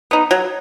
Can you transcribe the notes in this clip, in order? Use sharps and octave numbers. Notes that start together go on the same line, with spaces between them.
B3 D#4
F#3